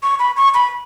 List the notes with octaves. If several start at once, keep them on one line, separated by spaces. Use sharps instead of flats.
C#6
B5
C#6
B5